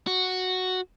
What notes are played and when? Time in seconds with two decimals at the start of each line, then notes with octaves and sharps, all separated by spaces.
0.07 F#4